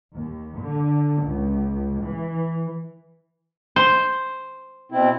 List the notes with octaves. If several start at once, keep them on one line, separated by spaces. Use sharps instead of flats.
D#2
D3
C#2
E3
C5
B2 C4 E4